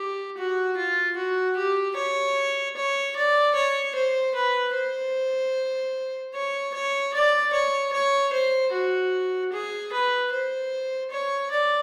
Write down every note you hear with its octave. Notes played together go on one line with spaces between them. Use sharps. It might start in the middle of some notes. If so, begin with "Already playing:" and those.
Already playing: G4
F#4
F4
F#4
G4
C#5
C#5
D5
C#5
C5
B4
C5
C#5
C#5
D5
C#5
C#5
C5
F#4
G#4
B4
C5
C#5
D5